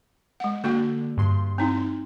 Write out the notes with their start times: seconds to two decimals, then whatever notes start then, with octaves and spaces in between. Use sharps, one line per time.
0.40 G#3 F#5
0.64 D3 A#3 F#4 G5
1.17 G2 C6
1.58 C4 D#4 E4